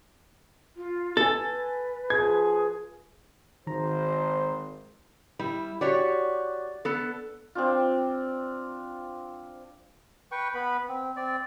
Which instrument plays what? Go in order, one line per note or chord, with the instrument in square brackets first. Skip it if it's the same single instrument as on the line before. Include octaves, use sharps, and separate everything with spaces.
[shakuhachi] F4
[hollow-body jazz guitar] A4 [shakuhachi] B4 [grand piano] G#5 A6
[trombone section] F3 G#4 [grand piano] G#6
[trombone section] G#1 C5 [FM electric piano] D#3 A#5
[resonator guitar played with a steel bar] G3 [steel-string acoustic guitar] E4
[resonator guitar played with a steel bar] F#4 G4 C#5 [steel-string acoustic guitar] D5
[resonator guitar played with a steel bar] B3 A4
[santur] C4 D4 F4
[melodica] B4 G5 C#6
B3 B4 B5
C4
C4 D5